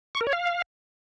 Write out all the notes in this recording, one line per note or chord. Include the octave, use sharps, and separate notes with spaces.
C#6
A#4
C#5
F5